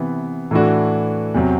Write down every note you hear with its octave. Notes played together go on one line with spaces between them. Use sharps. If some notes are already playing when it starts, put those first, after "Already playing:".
Already playing: C3 E3 B3
A2 E3 A3 D4 F#4
E2 C3 F#3 C4